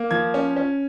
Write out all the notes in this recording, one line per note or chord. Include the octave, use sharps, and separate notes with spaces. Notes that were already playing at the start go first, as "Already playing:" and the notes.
Already playing: A#3
F3 G#6
C#4
C#4